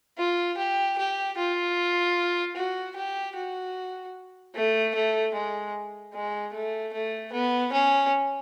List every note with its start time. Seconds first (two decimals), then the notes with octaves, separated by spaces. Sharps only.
0.18 F4
0.57 G4
0.98 G4
1.37 F4
2.56 F#4
2.96 G4
3.36 F#4
4.55 A3
4.95 A3
5.34 G#3
6.14 G#3
6.53 A3
6.93 A3
7.33 B3
7.73 C#4